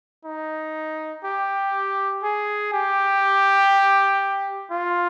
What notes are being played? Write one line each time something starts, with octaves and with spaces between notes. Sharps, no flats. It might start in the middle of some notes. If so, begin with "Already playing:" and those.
D#4
G4
G#4
G4
F4